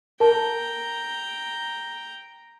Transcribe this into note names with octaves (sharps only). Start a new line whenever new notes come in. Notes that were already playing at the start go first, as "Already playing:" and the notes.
A#4 G5 A5 A#5